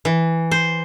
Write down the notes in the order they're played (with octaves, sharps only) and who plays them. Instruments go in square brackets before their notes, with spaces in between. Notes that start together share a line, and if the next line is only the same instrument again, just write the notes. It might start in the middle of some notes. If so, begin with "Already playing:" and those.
[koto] E3
C5